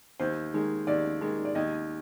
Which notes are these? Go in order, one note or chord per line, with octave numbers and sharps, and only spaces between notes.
D#2 C5
D#3 G#3
D#2 D5
D#3 G#3
D5
D#2 D#5